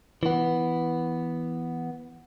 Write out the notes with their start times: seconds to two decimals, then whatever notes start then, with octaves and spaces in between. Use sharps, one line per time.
0.23 E3 B3